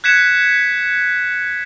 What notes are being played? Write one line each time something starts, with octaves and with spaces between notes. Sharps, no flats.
F#6 G#6 B6 C#7 E7